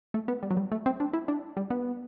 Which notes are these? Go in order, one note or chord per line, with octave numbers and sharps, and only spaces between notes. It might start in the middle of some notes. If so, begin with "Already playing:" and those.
A3
B3
G3
F#3
G3
A3
C4
D4
E4
D4
G3
B3